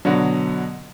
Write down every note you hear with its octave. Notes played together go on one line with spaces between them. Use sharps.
B2 D3 F#3